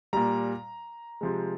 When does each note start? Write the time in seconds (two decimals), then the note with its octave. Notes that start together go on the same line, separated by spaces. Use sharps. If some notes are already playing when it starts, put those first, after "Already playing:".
0.13 A#2 G3 A#5
1.21 C3 F3 G#3